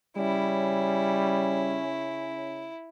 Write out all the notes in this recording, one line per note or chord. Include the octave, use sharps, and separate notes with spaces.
C#3 G3 C#4 E4